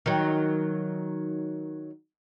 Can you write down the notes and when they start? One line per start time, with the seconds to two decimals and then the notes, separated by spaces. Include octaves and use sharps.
0.06 D#3 F#3